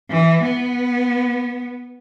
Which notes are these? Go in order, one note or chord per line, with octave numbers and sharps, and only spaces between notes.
E3
B3